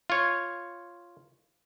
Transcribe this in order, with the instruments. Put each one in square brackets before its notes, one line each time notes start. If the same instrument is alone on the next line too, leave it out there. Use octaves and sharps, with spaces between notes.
[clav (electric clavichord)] F4 C#5